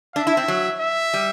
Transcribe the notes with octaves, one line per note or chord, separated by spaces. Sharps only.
D4 E5
E4
C4
F#3
E5
G3